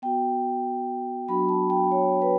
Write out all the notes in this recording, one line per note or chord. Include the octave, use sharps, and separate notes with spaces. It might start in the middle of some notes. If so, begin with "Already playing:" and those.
B3 F#4 G5
F#3 B3 D4 F#4 B5
A5
G5
C#5
B4